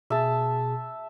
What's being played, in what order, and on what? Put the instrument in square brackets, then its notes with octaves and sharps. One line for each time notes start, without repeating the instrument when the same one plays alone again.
[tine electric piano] B2 G#4 [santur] E5 A5